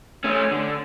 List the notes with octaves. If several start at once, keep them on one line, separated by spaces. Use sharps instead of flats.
A3 C#4
D3